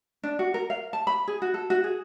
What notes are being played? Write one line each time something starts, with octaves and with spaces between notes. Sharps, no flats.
D4
F#4
A#4
F5
A5
B5
G#4
F#4
A4
F#4
G#4